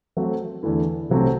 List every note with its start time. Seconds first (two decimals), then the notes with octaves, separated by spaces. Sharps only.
0.17 F#3 A3 C4 F#4
0.63 E2 D3 A3 E4
1.10 C2 C3 F#3 A3 C4